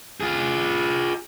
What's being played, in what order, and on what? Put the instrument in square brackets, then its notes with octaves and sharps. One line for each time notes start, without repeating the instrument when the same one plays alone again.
[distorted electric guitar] F4 G#4